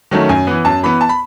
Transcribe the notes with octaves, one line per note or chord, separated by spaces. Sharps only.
D#3 F#3 A3 C#4
F#2 G#5
E3 B3
F#2 A5
E3 B3 B5
A5
B5